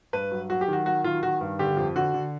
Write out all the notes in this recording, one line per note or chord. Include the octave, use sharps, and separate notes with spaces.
G2 B4
F#3
F#3 F#4
G4
D#3 F#4
F#3 F#4
D#3 F4
D#3 F#4
G2
D3 G4
F2
D3 F#4
D3